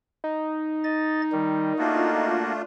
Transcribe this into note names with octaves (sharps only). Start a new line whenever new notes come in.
D#4
D#5 A6
D#3 G3
A3 A#3 D4 F4 F#4